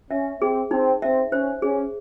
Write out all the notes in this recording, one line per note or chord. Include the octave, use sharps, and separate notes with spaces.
C#4 E5
C4 G#4
C4 D#4
C4 E5
C#4 C5
C#4 G#4